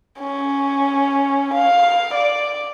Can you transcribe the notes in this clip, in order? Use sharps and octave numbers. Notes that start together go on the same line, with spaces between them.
C#4
F5
D5